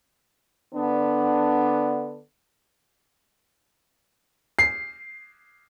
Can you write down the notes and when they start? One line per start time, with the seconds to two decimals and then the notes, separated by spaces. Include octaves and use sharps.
0.75 D3 B3 D4
4.59 C7